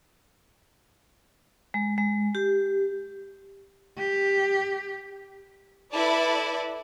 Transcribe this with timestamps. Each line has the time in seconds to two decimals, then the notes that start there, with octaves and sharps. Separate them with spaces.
1.74 G#3
1.98 G#3
2.35 G4
3.98 G4
5.93 E4 A4 B4 D5